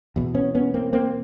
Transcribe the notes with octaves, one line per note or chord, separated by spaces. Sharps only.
E2 B2
B3 C#4
B3 C#4
A#3 C4
A#3 C4